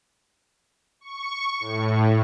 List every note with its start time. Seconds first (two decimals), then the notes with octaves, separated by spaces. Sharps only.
1.01 C#6
1.60 A2